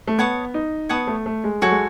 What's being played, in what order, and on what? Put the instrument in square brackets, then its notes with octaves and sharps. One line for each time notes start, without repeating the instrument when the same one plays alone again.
[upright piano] A3
[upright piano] B3 [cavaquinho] C#5 F#5 A5 D#6
[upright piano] D#4
[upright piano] B3 [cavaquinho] C#5 F#5 A5 D#6
[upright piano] A3
A3
G#3
[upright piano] F#3 [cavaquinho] F#4 A4 C#5 G#5
[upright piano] G#3